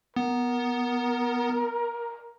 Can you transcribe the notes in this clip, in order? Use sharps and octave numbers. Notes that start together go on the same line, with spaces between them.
B3 A#4